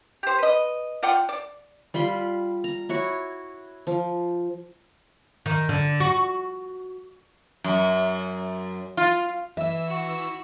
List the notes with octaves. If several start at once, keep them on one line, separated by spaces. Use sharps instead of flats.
G4 C5
B4 D#5
F4 D5 F#5 G5
D5
G3 F4 B5 C6
A#5
E4 F#4 C#5
F3
D#3
D3
F#4
F#2
F4
E3 E5 E6
F#4